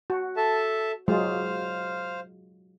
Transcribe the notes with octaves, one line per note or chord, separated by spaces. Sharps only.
F#4
A4 E5 A5
F#3 G#3 F4 C5 F5 F6